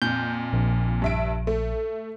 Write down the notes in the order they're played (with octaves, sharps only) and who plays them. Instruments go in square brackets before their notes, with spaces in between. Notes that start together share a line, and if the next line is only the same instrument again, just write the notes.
[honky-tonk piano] F2 A#2 [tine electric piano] G6
[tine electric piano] A#1
[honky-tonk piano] G2 E5 D7
A3